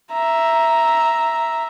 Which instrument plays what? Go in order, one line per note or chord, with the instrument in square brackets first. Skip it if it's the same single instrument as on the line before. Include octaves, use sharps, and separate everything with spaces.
[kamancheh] E5 A#5